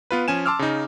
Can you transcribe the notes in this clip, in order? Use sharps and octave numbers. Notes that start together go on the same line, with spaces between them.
B3 F4 B4
F3 C#4 G#5 E7
A5 C6 D6 E6 F6
C#3 D#4